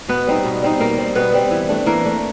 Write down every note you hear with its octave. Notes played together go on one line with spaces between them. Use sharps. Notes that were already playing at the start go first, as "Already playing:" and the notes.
B2 B3 B4
G3 C4 D#4
B2
G3 C4 D#4
B2 A#3 A#4
G3 C4
B2 B3 B4
G3 C4
E3
A3 D4
E3 A#3 A#4
A3 D4